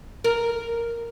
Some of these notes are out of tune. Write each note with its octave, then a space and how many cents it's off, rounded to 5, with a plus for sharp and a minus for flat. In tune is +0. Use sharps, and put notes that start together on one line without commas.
A#4 +0